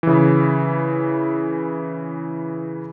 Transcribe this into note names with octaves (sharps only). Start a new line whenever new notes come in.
C#3 E3